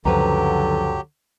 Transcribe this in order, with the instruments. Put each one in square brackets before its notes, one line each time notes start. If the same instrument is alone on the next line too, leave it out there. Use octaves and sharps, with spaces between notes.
[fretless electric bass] C#2 F#2 [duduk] D3 [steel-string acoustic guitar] F3 B4 A#5 [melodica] F#3 G4